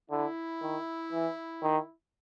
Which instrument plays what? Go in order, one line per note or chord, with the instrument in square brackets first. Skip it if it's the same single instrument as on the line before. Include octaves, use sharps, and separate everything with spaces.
[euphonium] D3 [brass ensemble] E4
[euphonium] D#3
E3
D#3